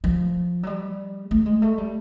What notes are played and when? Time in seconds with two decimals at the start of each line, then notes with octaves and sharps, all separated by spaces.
0.04 F3
0.63 F#3
0.67 G3
1.31 A3
1.46 G#3
1.62 A3
1.78 G3